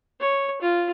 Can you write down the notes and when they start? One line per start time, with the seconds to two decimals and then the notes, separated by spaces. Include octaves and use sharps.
0.20 C#5
0.61 F4